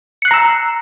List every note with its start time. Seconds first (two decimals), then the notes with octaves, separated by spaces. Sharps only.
0.22 C#7
0.25 F#6
0.28 C7
0.31 A#5
0.34 E6